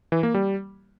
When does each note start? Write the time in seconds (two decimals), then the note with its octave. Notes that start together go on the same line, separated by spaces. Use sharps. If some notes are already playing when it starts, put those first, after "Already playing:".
0.12 E3
0.23 A#3
0.34 G3